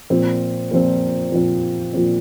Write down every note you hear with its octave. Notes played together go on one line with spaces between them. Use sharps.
A#2 F3 C4
A#2 F3 C4
A#2 F3 C4
A#2 F3 C4